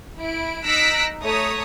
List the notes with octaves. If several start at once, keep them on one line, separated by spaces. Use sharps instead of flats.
E4 D7
D#4 E6 F#6 A#6 B6 D7
A3 C#5 A#5 D#6